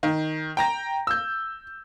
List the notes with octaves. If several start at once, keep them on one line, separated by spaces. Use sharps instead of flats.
D#3
G5 A#5 A#6
E6 G6